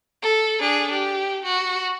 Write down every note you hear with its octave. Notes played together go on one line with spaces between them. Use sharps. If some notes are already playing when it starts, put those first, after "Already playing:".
A4
D4 G#4
G4
F#4